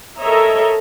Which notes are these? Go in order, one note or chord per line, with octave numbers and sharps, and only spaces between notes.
A4 A#4 C#5 D#5 E5 A#5